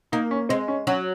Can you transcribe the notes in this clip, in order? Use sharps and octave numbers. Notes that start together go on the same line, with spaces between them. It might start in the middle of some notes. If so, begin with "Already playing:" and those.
A#3 D#4
C#4
G#3 C4
C#4
F#3 C#4